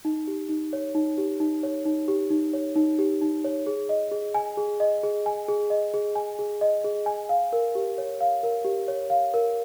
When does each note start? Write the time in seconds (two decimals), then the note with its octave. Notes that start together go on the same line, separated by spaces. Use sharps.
0.05 D#4
0.27 G4
0.49 D#4
0.73 C#5
0.95 D#4
1.18 G4
1.40 D#4
1.63 C#5
1.85 D#4
2.08 G4
2.30 D#4
2.53 C#5
2.76 D#4
2.99 G4
3.21 D#4
3.44 C#5
3.67 G#4
3.89 D#5
4.12 G#4
4.34 G#5
4.57 G#4
4.80 D#5
5.03 G#4
5.26 G#5
5.48 G#4
5.70 D#5
5.94 G#4
6.15 G#5
6.39 G#4
6.61 D#5
6.84 G#4
7.06 G#5
7.29 F5
7.53 A#4
7.75 G4
7.98 C#5
8.21 F5
8.43 A#4
8.65 G4
8.88 C#5
9.10 F5
9.34 A#4